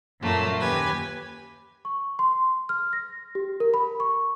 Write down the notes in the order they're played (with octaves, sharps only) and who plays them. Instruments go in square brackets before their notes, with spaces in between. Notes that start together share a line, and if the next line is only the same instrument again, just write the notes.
[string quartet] F#2 A#2 A3 A#3
D#2 G4 B4 G#5
[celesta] C#6
C6
F6
A#6
G4
A#4
B5
C#6